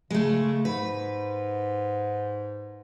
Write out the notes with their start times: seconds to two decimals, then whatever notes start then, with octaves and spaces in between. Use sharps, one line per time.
0.10 C#3 G#3 A3
0.65 G#2 B4